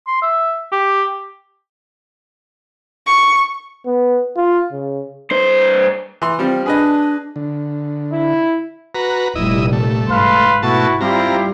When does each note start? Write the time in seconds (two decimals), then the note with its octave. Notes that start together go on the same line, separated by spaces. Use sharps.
0.07 C6
0.22 E5
0.72 G4
3.07 C#6
3.86 B3
4.36 F4
4.72 C#3
5.31 G2 C5
6.22 E3 C6
6.39 F3 G3 C4
6.66 D4 G#4 B4 D#5
7.36 D3
8.12 E4
8.95 F#4 B4 A#5
9.35 F1 A#2 G3 E4 D#5
9.73 A3
10.09 G#2 B4 F5 C6
10.63 B2 A3 E4 F#4 A5
11.01 G3 C4 E4 F4 G4 A#5